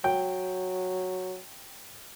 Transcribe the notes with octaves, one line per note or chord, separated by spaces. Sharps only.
F#3 G5